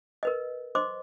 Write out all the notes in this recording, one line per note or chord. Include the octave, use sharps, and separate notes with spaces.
A#4 B4 D#5
C5 D#5 C6 D6